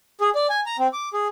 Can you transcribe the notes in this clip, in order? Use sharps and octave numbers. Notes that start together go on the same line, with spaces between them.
G#4
D5
G#5
A#5
C4
D6
G#4